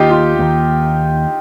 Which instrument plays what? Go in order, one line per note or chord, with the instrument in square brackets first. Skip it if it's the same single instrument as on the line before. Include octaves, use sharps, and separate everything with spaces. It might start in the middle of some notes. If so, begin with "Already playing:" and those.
Already playing: [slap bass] D#2 D#3 A#3 [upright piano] D#4 F4 G4
[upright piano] F4
[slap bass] D#2 D#3 A#3